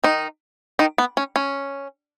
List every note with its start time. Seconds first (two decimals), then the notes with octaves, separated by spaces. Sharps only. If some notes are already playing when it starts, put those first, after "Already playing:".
0.04 D#3 D#4
0.79 D#3 D#4
0.98 B3
1.17 C#4
1.36 C#4